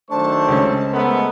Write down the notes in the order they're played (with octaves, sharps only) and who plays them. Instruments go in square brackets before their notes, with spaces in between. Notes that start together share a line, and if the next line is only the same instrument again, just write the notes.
[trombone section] D#3 F#3 D4 [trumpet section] A3 C5 C#6 [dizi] A5
[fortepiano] C#2 C#4
[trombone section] G#3 A3 B3 [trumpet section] A4 A#4 C5